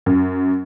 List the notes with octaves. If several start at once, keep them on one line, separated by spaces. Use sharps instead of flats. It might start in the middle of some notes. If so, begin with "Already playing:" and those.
F#2